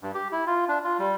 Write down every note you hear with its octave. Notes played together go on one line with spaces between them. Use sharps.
G2
G4
E4
F4
D4
F4
G3